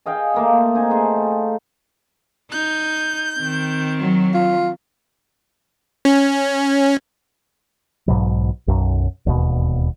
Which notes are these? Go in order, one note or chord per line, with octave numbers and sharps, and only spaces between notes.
G#4 D#5 F5 G5
A3 A#3 F4
C4 D#4 G#5
A3 F4 G#4
A3
D#4 G6
D#3 C4
F#3
F4
C#4
B1 G#2 B2 F#3
B1 F#2
E1 D#2 B2